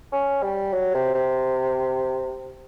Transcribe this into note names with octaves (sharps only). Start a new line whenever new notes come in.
C#4
G3
F#3
C3
C3